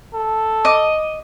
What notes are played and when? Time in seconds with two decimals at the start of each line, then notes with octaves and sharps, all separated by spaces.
0.14 A4
0.65 D#5 D6